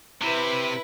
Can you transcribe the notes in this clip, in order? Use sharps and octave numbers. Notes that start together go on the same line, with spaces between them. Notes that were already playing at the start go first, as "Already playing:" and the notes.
C3 E4 B4